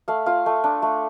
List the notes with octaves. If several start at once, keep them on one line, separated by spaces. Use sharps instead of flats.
A3 F5
F4 F5
A3
D4
A3